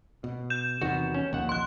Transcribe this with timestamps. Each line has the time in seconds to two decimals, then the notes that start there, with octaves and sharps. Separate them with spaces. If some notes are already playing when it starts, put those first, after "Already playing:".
0.24 B2
0.50 G6 E7
0.81 E2 C3 D#3 B3 F#4
1.14 C#4
1.33 A#1 D#2 F#5
1.49 C6 F#6